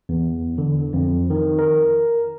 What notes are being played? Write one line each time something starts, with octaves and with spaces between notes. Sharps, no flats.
E2
D3
F2
D#3
A#4